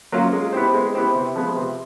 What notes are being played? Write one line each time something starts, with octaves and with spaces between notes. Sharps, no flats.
F#3 A#3 C#4 F4
G#3
B3 E4 G4 C5
G#3
B3 E4 G4 C5
C3
F3 G#3 B3
C3